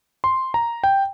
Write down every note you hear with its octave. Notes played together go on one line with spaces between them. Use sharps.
C6
A#5
G5